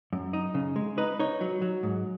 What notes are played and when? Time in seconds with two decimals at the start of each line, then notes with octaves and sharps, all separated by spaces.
0.13 F#2
0.33 D#4
0.54 C#3
0.76 G#3
0.98 D#4 B4
1.19 D#4 C#5
1.41 F#3
1.62 F#3
1.83 G#2